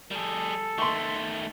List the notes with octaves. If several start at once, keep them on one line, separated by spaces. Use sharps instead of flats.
G3 G#4 A4
D#3 A3 C6 C#6